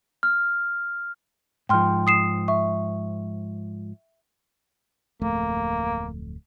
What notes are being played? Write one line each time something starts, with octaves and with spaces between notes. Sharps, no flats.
F6
G#2 F3 G5 C6 F6
D#6 C7 E7
E5 C#6
D1 F2 A3 A#3